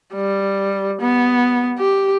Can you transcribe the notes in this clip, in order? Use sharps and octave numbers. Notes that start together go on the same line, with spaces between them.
G3
B3
G4